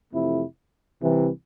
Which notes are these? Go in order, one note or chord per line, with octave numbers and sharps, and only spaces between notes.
F2 C3 E3 A3 E4
C2 C3 E3